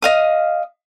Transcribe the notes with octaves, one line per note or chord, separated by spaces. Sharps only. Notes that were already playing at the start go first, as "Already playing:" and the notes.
D#5 F5 D#6